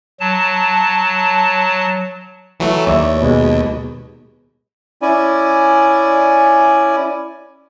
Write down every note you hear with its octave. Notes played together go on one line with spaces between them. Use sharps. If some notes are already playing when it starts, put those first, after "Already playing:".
F#3 A5
E3 F#3 A3
D#2 C#5 D5 E5
B2 G#3
C#4 E4 D5 G#5